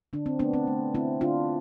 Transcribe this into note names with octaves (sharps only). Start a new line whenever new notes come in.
D3 D4
C4
A3 B3 D4
C4
A3
D3 C4 E4
D3 D4 F4